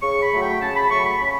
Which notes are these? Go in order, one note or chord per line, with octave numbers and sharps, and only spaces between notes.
C#3 C#6
B5
F#3 A3
G5
C#3 A5
B5
F#3 A3 C#6
B5
C#3 B5